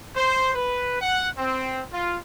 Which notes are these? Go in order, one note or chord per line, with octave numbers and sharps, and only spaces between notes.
C5
B4
F#5
C4
F4